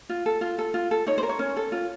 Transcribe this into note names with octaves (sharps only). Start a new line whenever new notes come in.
F4
A4
F4
A4
F4
A4
D#4 C#5
C5
A#4
C#5
C#4
A4
F4